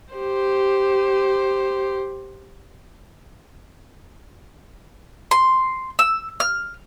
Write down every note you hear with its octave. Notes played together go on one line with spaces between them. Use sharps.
G4 C5
C6
E6
F6